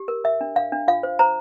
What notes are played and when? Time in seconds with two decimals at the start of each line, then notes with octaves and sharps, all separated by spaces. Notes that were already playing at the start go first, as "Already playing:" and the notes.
Already playing: G4
0.08 A#4
0.24 A#4 E5
0.41 D4
0.56 D4 F5
0.72 D4
0.88 F4 F5
1.03 C5
1.19 C5 A#5